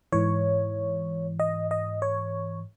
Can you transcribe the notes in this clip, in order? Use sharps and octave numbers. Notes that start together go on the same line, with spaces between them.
G#2 E3 C#5
D#5
D#5
C#5